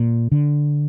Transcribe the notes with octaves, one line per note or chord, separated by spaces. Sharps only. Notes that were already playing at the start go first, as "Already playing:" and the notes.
Already playing: A#2
D3